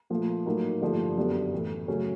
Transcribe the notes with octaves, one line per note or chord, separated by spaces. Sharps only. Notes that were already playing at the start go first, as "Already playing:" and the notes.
A#2 F3 A3
A2 F#3 A#3 D#4
G2 D3 F3 A3
F#2 D3 G3 B3
A2 E3 A3
C#3 F#3 A3 C#4